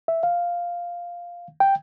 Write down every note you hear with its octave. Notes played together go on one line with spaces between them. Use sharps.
E5
F5
G5